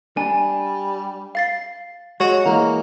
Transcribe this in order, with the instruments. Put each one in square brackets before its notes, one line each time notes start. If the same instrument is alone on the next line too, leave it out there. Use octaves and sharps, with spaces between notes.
[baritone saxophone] G3 [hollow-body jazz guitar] D4 [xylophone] G#5
[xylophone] F5 A6 C7
[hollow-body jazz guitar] G#3 [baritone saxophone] F#4 [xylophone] C#5
[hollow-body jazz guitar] E3 G#3 [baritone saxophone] A#3 [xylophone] A#5